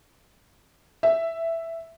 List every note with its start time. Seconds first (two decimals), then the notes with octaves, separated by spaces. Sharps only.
1.03 E5